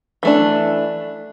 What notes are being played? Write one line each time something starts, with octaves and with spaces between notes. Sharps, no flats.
E3 A3 D4